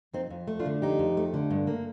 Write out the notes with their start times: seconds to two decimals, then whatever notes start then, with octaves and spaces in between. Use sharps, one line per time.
0.13 F2 C4 D#4
0.30 F2
0.48 A3
0.59 D4 F4
0.66 D3
0.82 F2 D#4 G4
0.99 F2
1.17 A3
1.34 D3
1.50 G2
1.67 A#3